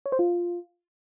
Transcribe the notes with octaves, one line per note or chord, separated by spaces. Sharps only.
C#5
C5
F4